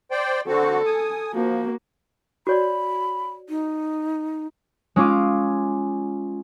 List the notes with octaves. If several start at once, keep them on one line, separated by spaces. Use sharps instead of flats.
C5 D5 G5
D3 C4 F#4 A4
G#5 D#6
F3 A#3 F#4
F#4 C#5 D5 B5
D#4
G#3 C#4 F4 D6